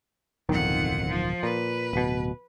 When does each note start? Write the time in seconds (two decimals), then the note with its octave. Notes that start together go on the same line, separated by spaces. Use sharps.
0.49 D1 B1 F2 D#3 F#5
1.09 F3
1.43 A#2 B4
1.93 D1 B2